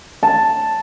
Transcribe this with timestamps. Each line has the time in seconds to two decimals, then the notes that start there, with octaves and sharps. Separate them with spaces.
0.23 A5